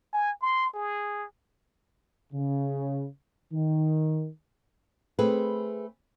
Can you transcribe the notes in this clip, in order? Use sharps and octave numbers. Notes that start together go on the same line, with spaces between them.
G#5
C6
G#4
C#3
D#3
A3 C4 G#4 B4